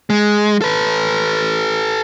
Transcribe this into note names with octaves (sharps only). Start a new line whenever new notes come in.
G#3
A4 B4